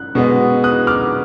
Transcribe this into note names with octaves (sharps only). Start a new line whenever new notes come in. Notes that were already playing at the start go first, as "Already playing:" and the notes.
Already playing: F#6
B2 G#3 B3
D#6 F#6
D6 F6